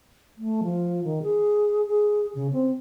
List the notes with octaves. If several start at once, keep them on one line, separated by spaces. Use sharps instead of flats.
A3
F3
D#3
G#4
G#4
C#3
C4